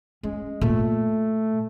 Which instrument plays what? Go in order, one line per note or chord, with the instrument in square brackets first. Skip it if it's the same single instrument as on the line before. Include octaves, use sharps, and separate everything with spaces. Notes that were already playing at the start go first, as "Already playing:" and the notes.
[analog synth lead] G#3 [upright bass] C#4
[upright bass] A#2 [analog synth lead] A3